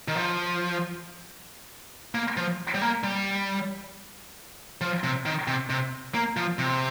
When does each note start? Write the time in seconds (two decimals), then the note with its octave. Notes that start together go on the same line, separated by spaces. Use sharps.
0.08 D#3
0.15 F3
2.15 A#3
2.37 F3
2.74 G3
2.82 A#3
3.04 G3
4.81 F3
5.04 C3
5.26 D#3
5.47 C3
5.70 C3
6.14 A#3
6.37 F3
6.59 C3